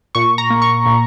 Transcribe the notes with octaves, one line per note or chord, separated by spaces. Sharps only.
A#2 C#6
A#5
A#3
C#6
A#2